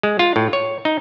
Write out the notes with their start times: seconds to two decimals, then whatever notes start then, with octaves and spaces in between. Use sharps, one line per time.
0.03 G#3
0.19 F4
0.36 A2
0.53 C#5
0.85 D#4